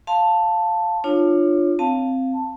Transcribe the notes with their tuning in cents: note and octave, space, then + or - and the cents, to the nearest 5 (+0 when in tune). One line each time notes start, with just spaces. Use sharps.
F5 +0 A5 +5 C6 +0
D4 +30 F4 +0 C#5 +0
C4 +0 F5 +0 A5 +10